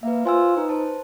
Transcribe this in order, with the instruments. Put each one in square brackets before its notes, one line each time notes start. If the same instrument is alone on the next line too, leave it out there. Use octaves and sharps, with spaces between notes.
[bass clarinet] A#3 [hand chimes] B4 E5
[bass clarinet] F4 [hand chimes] C5 G#5 E6
[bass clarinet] D#4 [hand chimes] B4
[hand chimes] C5 A5